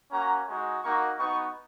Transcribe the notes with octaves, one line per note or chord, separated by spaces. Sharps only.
A#3 C#4 F#4 A#5
G#3 D#4 F#4
A#3 D#4 F#4 C#6
B3 D#4 F#4 C#6